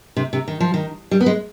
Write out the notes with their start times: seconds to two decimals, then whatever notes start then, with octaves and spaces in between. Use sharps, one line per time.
0.17 C3
0.33 C3
0.48 D#3
0.60 F3
0.74 D#3
1.11 G3
1.21 B3
1.26 G#3